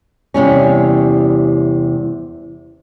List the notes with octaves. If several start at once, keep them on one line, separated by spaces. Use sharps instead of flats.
E2 C3 G3 C#4